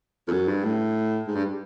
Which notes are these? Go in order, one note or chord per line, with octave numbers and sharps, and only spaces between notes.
F2
F#2
G2
A2
G#2
G2